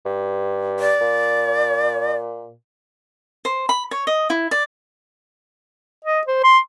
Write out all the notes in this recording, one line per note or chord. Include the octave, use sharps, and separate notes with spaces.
G2
D5
A#2
C5
B5
C#5
D#5
E4
D5
D#5
C5
C6